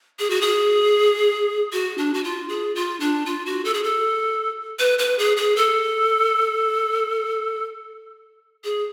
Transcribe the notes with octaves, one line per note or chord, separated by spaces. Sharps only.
G#4
F#4
G#4
F#4
D4
F#4
F4
G#4
F4
D4
F4
F#4
A4
G#4
A4
B4
B4
G#4
G#4
A4
G#4